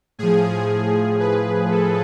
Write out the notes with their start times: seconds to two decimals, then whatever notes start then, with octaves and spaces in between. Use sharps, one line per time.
0.19 A2 F3 G#4
1.20 B4
1.71 A4